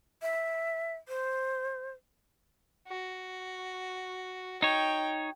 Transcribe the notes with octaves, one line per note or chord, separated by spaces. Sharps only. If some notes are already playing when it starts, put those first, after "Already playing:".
E5
C5
F#4
D#4 C#5 G5